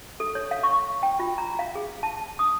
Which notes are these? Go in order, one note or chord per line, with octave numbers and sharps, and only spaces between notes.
A4
C#5
F5
C#6
G5
F4
A#5
F5
G#4
A5
D#6